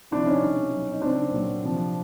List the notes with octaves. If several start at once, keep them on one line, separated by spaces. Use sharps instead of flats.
C3 F3 D4 E4
C#4 D#4
B2 G3
B2 F#3
D#4
C#3 F#3 C4 D4
A#2 F#3
C3 F3